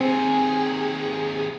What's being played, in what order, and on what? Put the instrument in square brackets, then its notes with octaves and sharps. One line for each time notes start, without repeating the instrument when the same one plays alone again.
[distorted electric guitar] D#2 C3 [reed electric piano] C4 [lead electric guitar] G#4